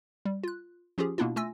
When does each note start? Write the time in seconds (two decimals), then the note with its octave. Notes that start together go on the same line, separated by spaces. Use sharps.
0.25 G3
0.44 F4 F#6
0.98 F3 C#4 F4 G4 G#4
1.18 B2 A#3 B3 D4 E4 F4
1.36 A3 F4 G#5 E6 A#6